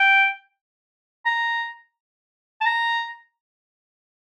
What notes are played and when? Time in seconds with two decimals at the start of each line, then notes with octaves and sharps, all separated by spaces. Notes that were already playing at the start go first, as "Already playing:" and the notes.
Already playing: G5
1.26 A#5
2.61 A5
2.66 A#5